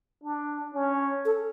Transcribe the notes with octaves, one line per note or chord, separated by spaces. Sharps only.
D4
C#4
A4